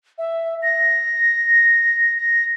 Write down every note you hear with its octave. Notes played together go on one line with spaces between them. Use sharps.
E5
A#6
A#6